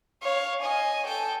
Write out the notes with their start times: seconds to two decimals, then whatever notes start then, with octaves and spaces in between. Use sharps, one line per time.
0.22 C#5 F5
0.63 D#5 G#5
1.07 A4 G5